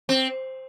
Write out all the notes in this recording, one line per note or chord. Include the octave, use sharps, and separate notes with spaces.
C4